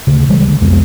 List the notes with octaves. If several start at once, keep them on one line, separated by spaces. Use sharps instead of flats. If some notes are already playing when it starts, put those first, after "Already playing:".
D2 C#3
C#3 E3 G3 G#3
D3 A#3
C2 F2 G#3 B3